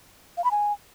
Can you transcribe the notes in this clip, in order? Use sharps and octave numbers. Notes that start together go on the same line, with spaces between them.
F5
B5
G#5